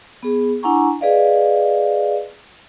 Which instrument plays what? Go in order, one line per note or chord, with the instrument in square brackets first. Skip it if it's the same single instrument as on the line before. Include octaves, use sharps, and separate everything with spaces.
[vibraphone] B3 G#4
D4 E4 F#5 G#5 A#5 C#6
G#4 B4 D5 D#5 F5